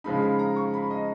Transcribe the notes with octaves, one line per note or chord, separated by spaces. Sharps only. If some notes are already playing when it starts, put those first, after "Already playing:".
C#3 F3 G#3 D#4 B5
B5
A#5
C#6
B5
D#5